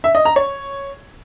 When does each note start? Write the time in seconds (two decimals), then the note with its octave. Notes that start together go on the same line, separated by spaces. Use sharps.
0.04 E5
0.15 D#5
0.25 A#5
0.36 C#5